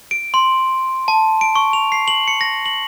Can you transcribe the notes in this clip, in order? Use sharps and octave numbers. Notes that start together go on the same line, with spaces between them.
D7
C6
A5
D7
C#6
F7
C7
F#7
C#7
A#6
F#7